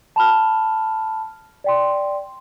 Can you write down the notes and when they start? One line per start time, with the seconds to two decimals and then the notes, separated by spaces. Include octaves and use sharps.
0.16 A5 B5 F6
1.64 D5 G5 C6